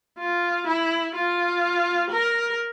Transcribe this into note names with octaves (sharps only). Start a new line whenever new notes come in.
F4
E4
F4
A#4